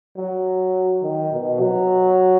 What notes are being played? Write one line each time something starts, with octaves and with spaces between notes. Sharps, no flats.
F#3
D#3
B2
F#3